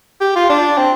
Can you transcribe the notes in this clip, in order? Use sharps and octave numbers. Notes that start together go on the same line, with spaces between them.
G4
F4
D4
C4